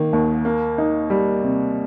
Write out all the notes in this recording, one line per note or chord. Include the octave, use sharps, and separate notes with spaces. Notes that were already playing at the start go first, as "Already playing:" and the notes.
Already playing: D#3 A#3
D#2
A#3
D#4
G3
C3